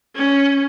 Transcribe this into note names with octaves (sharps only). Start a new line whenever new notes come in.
C#4